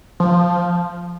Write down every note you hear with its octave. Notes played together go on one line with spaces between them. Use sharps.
F3